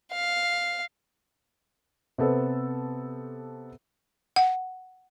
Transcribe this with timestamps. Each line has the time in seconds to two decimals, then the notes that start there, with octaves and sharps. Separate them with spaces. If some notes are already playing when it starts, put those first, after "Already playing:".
0.12 F5
2.18 C3 B3 A4 B4 C5
4.36 F#5